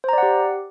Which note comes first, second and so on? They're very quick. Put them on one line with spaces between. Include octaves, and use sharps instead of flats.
C5 A#5 D5 F#5 G4